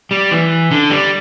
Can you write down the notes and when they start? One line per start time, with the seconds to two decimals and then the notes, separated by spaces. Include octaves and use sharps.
0.11 G3
0.31 E3
0.71 D3
0.90 G3